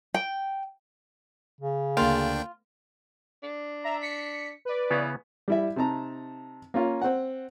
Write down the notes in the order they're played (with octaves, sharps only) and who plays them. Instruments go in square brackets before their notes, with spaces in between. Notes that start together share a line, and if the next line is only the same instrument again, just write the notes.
[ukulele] G5
[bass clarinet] C#3
[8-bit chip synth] D2 D4 G5 [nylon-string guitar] A#3 [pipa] F4
[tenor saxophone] D4
[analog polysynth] E5 A#5
B6 C#7
B4 D5
[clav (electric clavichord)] C#3 B3 C#4 [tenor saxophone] E3
[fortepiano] G3 E4 E5
C3 D#4 A5 A#5
A#3 C#4 F4
C4 F#5